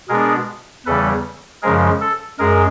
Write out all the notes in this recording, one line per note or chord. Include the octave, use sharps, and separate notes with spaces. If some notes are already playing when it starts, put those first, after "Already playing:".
B2 G#3 B3 D4 G#4 A#4
E2 C#3 E3 G3 A4 B4
F#2 C#3 F3 G#3 G#4 A#4
A4
F#2 G#3 G#4 A#4